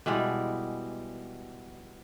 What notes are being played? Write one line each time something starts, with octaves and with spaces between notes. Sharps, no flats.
B2 E3 G3 G#3